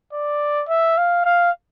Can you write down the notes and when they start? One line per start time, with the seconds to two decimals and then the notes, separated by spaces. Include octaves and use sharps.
0.13 D5
0.69 E5
0.97 F5
1.25 F5